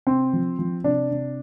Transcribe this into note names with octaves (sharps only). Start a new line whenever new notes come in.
C3 C4
F3
F3
C3 D4
C3